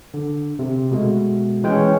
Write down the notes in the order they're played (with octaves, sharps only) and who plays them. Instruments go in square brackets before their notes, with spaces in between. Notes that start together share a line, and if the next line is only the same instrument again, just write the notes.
[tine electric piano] D3
C3
B2 G#3 A3
[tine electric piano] E3 G#3 G5 [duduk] C#4